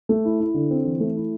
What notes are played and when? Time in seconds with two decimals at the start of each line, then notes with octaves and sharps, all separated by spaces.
0.09 A3
0.25 E4
0.40 E4
0.54 D3
0.70 C4
0.85 E3
1.00 A3
1.16 E4